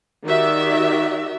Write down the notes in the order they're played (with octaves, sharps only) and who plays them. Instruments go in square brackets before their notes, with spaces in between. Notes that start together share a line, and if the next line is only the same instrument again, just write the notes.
[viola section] D#3 F#4 G4 D5 E5